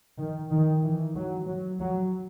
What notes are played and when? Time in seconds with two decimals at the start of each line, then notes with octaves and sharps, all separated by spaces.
0.17 D#3
0.50 D#3
0.83 E3
1.14 F#3
1.47 F#3
1.80 F#3